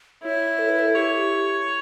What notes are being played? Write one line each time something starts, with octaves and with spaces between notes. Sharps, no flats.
E4 C#5
A4
B4
A4
G4 C#5